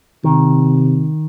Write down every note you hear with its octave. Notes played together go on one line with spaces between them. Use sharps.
C3 D#3